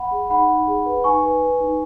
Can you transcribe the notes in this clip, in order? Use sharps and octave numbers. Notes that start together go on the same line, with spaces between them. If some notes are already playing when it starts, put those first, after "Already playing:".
Already playing: F#5 B5
G#4
D#4 F#5 B5
D#4
G#4
B4
D#4 G#5 C#6
B4
B4
D#4